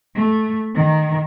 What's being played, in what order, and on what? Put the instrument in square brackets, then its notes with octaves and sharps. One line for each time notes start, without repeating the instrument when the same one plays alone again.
[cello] A3
D#3